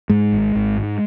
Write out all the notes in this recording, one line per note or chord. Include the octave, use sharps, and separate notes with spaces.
G#2 G#3
G#1
G#1
G#2